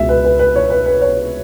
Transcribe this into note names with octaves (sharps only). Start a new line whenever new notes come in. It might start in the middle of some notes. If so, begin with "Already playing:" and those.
Already playing: C#2 B2 G#3 E5
B4
B4
B4
C#5
B4
B4
C#5